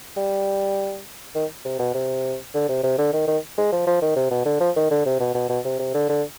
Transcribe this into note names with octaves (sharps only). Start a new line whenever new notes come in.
G3
D#3
C3
B2
C3
D3
C3
C3
D3
D#3
D#3
G#3
F3
F3
D#3
C3
B2
D3
F3
D#3
D3
C3
B2
B2
B2
C3
C3
D3
D3